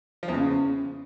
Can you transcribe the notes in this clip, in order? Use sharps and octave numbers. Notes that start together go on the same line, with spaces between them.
F3
E2
C#3